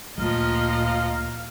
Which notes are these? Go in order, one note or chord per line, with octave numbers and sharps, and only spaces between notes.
D2 A#2 F3 A#3 D#5 F5 A#5 F6